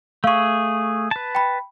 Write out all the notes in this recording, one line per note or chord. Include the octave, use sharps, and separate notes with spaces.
A3 G#4 F5 C#6
B4 A5
G5 B5